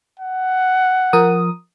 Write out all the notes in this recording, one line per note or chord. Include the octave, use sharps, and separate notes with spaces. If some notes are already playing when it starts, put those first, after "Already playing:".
F#5
F3 A#4 D#6